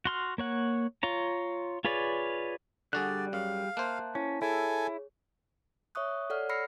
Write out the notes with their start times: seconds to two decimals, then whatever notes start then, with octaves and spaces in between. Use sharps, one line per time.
0.05 F#4 C6 F6
0.38 A#3 C#5 F#5
1.03 F4 C#5 A#5
1.85 F4 G#4 B4 C#5 D5
2.93 D3 G3 F#4 G#4 D5 F#6
3.33 F#2 G#4 F5
3.77 A#3 C5 E5 A5 F#6
4.15 C#4 E4 A5
4.42 E4 G#4 A4 C#5 G#5
5.95 C#5 E5 C#6 D#6 F#6
6.30 A4 C#5 D5 F#5 F6
6.49 B5 E6 F6 A#6 C7 C#7